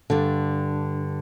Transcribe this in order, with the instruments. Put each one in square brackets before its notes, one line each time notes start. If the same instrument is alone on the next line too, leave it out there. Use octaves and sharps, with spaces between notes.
[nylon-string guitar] G2 D3